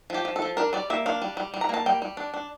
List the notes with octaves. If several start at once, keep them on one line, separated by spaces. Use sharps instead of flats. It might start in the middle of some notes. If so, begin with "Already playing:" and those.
F3 G4
F3
A4
F3
D4 A#4
G3 D5
A#3 E5
D4 F5
G3
G3
G3
A#5
A#3 A5
G3 G5
G3
D4
D4